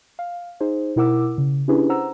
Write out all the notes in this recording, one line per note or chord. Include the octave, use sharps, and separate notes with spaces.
F5
D#4 G#4 C5
B2 E4 A#4 F#5 D6 E6
C#3
C#4 D4 E4 G4 G#4 B4
C5 F#5 A#5 E6